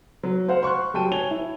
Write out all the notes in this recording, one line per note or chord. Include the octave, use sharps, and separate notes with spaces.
F#3
C5 F5 F#5
C6 C#6 F6 F#6
F#3 G3 G5 A5 D#7
C#5 G#5 G#6 F7 G7
E4